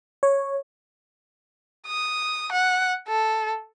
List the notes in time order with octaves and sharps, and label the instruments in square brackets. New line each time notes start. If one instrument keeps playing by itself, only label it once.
[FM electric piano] C#5
[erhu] D#6
F#5
A4